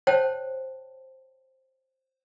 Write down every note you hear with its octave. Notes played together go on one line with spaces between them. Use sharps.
C5 C#5 G5 A5